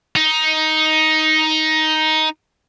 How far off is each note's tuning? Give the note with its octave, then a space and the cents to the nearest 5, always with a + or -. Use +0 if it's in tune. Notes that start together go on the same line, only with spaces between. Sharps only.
D#4 +10